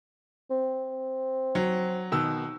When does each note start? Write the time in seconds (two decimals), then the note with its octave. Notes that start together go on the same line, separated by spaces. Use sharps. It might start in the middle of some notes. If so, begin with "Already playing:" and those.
0.51 C4
1.55 F#3
2.12 B2 D#3 E6